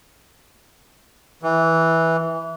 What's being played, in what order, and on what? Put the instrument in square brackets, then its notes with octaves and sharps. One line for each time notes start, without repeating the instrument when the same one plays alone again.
[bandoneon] E3